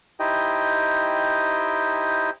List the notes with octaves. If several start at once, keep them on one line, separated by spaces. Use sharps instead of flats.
D#4 E4 G4 C5 D#5 G5